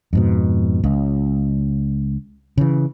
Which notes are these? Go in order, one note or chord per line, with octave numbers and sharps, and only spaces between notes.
F2 G#2 B2
C#2
C#3 E3